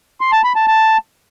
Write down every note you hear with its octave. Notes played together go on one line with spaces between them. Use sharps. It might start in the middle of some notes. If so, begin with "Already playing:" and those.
C6
A5
B5
A5
A5